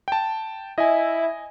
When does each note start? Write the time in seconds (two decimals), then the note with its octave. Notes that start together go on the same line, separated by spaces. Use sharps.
0.08 G5 A5
0.78 E4 D#5 G#5